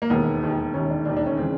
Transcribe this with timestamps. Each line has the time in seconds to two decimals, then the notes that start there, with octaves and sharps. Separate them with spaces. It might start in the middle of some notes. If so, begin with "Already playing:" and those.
0.02 A#3
0.10 E1 D#2 D#3 B3
0.42 E1 D#2 D#3
0.74 E1 D#2 D#3 C#4
0.90 D4
1.05 E1 D#2 D#3 D4
1.17 D4
1.26 C#4
1.37 C#3 E3 C4